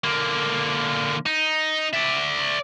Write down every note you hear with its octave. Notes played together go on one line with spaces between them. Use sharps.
D3 A#3
D#4
D5 E5